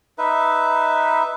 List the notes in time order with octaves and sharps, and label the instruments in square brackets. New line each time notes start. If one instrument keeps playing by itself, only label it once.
[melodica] D#4 B4 E5